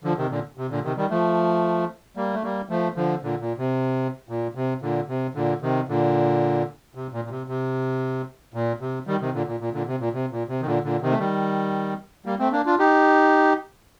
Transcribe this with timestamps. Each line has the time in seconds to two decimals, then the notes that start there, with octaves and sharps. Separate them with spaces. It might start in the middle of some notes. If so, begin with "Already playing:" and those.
0.04 D3 F3
0.18 C3 D#3
0.30 A#2 D3
0.58 C3
0.70 A#2 D3
0.84 C3 D#3
0.97 D#3 G3
1.10 F3 A3
2.17 G3 A#3
2.34 A3
2.43 G3 A#3
2.69 F3 A3
2.96 D3 F3
3.23 A#2 D3
3.40 A#2
3.58 C3
4.29 A#2
4.55 C3
4.82 A#2 D3
5.09 C3
5.35 A#2 D3
5.62 C3 D#3
5.88 A#2 D3
6.95 C3
7.12 A#2
7.25 A#2
7.30 C3
7.48 C3
8.54 A#2
8.80 C3
9.07 D#3 G3
9.20 C3 D#3
9.33 A#2 D3
9.47 A#2
9.61 A#2
9.74 A#2 D3
9.87 C3
10.00 A#2
10.13 C3
10.31 A#2
10.49 C3
10.61 D#3
10.66 A#2 D3
10.84 A#2 D3
11.02 C3 D#3
11.11 A3
11.19 D#3 G3
12.26 G3 A#3
12.39 A3 C4
12.52 A#3 D4
12.66 D4 F4
12.79 D#4 G4